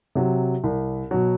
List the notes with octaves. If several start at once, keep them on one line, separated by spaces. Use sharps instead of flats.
C3 F#3
C2
B2 F#3